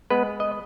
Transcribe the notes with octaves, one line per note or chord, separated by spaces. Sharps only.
G#3 B3 B4
D#5